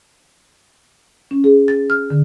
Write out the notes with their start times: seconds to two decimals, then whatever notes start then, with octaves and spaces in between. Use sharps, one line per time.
1.31 C#4
1.44 G#4
1.68 A6
1.90 F6
2.10 D3